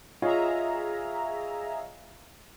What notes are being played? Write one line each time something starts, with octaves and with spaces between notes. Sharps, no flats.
F4 G#4 C#5 D#5 E5 A#5